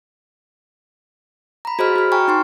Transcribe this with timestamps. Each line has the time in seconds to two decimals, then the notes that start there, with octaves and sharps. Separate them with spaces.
1.65 A#5 B5
1.79 F#4 G#4 C5 D#5 B5 F6
1.96 F#4 F6
2.12 G5 G#5 A#5 C#6 F6
2.28 D#4 C6 C#6